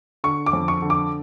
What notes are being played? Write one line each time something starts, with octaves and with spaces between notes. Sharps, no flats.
D3 C#6
D6
F2
C#6
D3
D6